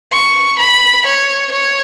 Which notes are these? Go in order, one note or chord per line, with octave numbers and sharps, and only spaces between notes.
C#6
B5
C#5
C#5